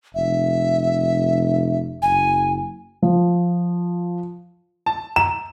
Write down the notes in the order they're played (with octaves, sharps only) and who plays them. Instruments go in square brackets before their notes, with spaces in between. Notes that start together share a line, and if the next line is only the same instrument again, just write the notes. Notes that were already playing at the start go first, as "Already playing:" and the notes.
[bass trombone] F1 [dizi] E5
[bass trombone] F#1 [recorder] G#5
[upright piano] F3
A5
[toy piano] A#5 [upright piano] E7